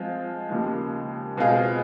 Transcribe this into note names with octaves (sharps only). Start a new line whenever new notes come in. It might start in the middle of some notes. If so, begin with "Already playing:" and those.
Already playing: F3 G#3 C4 F4
D#2 C#3 F3 G#3
B2 G#3 C4 F4 G#4